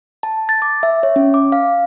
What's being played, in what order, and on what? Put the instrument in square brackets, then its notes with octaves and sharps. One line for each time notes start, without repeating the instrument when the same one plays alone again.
[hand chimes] A5
A6
D6
E5
C#5
C#4
D6
F5